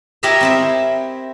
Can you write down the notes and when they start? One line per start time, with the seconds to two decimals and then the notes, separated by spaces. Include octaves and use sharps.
0.23 E4 G4 A#4 C#5 D#5 E5
0.41 C4 E4 E5